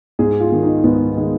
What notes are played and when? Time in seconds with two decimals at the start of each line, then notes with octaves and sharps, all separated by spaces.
0.19 G#2 G#4
0.40 F4
0.52 D#3
0.62 D#4
0.84 G#2 B3
1.17 D#3 G#3